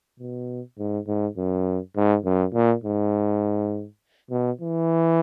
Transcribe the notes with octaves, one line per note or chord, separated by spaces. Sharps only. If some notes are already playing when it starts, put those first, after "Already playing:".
B2
G#2
G#2
F#2
G#2
F#2
A#2
G#2
B2
E3